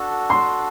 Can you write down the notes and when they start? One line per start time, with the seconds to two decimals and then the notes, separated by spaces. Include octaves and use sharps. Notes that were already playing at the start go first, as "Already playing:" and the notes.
Already playing: D4 F#4 A4
0.30 C6